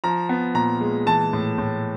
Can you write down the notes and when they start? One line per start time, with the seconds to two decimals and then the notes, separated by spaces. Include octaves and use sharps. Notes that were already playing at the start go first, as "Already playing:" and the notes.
0.04 F3 A#5
0.29 B3
0.55 A#2 A#5
0.81 G#3
1.06 E3 A5
1.33 A2
1.58 A2